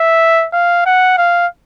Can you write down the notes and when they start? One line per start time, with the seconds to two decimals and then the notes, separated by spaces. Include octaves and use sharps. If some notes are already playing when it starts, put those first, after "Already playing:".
Already playing: E5
0.53 F5
0.86 F#5
1.18 F5